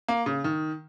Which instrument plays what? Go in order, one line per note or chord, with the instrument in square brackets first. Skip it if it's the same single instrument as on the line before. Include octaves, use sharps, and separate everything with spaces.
[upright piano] A#3
C#3
D#3